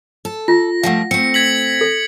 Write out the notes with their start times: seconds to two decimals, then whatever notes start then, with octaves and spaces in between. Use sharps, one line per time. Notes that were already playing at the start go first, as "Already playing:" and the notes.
0.25 A4
0.48 F4 A#6
0.83 F3 G3 A3 F5 F#5
1.11 A3 C4 C#7
1.34 G#6 B6 F#7
1.81 A4